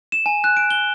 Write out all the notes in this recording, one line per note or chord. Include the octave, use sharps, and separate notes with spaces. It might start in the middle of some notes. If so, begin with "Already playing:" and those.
E7
G#5
F#6
D7
G7